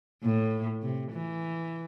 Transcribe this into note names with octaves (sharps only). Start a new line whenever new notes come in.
A2
C3
E3